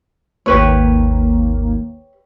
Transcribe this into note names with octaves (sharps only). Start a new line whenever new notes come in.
G#1 D#2 A#3 G4 B4 C#5